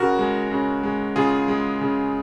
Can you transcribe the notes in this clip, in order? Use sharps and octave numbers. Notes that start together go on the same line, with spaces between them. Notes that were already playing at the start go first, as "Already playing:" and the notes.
Already playing: C#3 F#4 A#4
G#3
C#3
G#3
C#3 F4 G#4
G#3
C#3